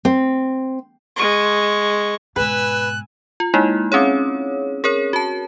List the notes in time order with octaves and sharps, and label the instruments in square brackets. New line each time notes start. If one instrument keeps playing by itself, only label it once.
[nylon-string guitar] C4
[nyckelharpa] G#3 C#6
[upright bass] G#2 B2 [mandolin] B4 [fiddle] G#5 E6 [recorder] F#6
[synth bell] F4
G#3 A#3 D#4 E4
C4 C#4 G#4 C#5
G#4 A#4 C#5
F#4 A5